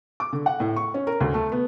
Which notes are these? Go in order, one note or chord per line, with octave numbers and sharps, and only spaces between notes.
D6
D3
F#5
A2
C#6
C#4
A#4
D2
A3
B3